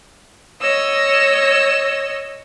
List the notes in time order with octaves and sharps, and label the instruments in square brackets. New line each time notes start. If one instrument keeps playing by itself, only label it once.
[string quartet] C#5 D#5 E6